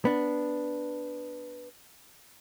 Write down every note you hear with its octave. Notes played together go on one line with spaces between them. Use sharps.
B3 D4